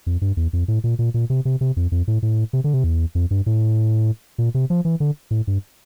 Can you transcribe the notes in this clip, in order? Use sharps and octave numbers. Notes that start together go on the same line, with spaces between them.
F2
G2
E2
F2
A2
A#2
A#2
A#2
C3
C3
C3
F2
F2
A2
A2
C3
D3
C3
E2
F2
G2
A2
A#2
C3
F3
E3
D3
A2
G2